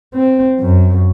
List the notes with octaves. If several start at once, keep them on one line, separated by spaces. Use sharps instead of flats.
C4
F#2